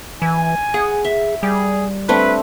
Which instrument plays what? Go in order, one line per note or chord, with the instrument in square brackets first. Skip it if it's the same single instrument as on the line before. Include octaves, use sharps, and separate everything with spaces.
[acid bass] E3 [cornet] G#5
[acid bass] G#4 [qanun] F#5
[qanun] E5
[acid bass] G3 [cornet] G#4
[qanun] A3 C4 D4 [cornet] B4